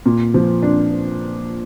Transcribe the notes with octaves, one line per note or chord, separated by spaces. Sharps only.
A#2
F3
D4